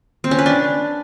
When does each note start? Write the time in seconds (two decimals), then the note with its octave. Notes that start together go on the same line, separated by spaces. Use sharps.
0.24 C4
0.31 C#4
0.39 B4
0.46 D4